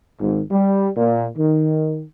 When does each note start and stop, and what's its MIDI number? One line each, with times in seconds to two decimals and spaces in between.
0.21 0.41 32
0.51 0.89 55
0.97 1.26 46
1.37 2.04 51